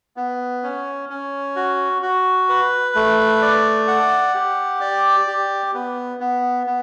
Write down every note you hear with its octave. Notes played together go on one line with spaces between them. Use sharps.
B3
C#4
C#4
F#4
F#4
B4
A3
D5
F#5
G4
D5
G4
B3
B3
B3